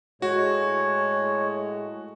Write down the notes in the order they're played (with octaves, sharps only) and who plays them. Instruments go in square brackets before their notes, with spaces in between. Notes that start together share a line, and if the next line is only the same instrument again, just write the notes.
[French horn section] A2 G#3 [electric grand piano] F#4 [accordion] C#5